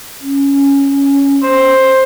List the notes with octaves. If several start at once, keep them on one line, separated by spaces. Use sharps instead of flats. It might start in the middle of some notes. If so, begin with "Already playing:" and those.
C#4
C5